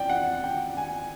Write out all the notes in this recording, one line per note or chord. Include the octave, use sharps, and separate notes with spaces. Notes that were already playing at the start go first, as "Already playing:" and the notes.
Already playing: D5 G5
F#5
G5
G#5